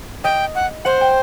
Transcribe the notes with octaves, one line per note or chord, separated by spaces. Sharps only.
D#5 G5
F#5
C5 F#5
G5